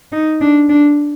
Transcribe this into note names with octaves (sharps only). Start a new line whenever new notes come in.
D#4
D4
D4